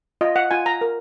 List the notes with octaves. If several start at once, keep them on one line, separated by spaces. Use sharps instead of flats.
F4 D#5
F#5
F4 G#5
A#5
A#4